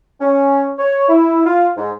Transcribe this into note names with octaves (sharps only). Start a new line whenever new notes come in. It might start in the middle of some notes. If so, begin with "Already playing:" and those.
C#4
C#5
E4
F4
G#2